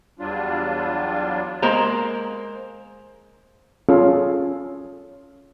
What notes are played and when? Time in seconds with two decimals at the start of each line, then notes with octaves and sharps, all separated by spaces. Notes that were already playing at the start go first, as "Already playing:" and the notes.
0.19 E2 F#3 G3 D4 F4
1.62 G#3 A#3 C5 A#5
3.89 C#4 F4 G#4 A4 F5